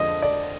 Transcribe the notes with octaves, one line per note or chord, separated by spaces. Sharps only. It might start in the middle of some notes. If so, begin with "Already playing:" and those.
Already playing: F2 D3 F3 G#3 D#5
D5